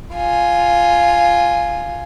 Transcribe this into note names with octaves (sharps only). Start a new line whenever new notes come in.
F4 G#5